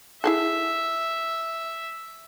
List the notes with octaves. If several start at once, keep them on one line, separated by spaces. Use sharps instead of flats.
E4 G#4 A4 E5